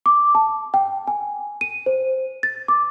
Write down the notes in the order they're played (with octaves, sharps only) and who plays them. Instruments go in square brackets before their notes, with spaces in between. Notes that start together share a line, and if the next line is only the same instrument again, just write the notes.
[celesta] D6
A5
G5
G#5
D#7
C5
A6
D6